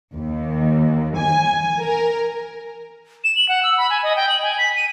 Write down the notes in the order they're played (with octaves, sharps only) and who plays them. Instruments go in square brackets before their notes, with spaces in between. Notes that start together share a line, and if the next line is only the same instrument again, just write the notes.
[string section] D#2
G#5
A#4
[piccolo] E7
F#7
F#5
E6
B5
G#5
D#5
G5
F#7
G#5
B6
D#7